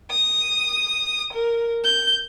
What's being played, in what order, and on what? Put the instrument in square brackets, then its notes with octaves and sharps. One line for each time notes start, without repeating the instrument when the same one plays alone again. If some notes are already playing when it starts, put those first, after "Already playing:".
[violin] D#6
A#4
G6